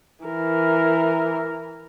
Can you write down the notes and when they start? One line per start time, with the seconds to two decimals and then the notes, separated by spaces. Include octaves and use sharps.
0.25 E3 A#4